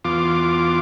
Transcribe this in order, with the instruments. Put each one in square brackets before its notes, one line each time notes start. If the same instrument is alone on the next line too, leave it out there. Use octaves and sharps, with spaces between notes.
[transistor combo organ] E2 F4 D6